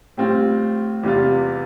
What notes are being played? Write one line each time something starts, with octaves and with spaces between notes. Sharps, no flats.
A2 G3 C4 F4
E2 C3 G3 B3 F4